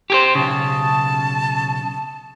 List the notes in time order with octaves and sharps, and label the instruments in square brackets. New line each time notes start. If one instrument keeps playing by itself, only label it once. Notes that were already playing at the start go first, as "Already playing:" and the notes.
[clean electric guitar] G4 G#4 C5
[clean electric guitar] B1 C#3 [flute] A5